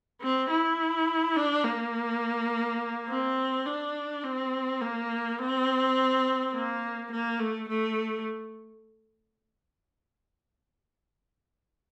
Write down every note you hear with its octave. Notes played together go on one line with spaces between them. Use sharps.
C4
E4
D4
A#3
C4
D4
C4
A#3
C4
A#3
A#3
A3
A3